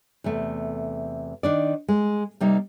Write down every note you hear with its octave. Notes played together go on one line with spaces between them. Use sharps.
E2 C3 A3
D#3 D4 D5
G#3
C3 G3 A#3 D#4